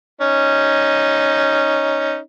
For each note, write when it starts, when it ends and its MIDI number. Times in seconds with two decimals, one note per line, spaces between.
0.21 2.18 61
0.21 2.18 63